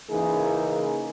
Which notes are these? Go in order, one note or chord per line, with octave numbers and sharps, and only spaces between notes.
C#3 E3 A#3 D#4 G#4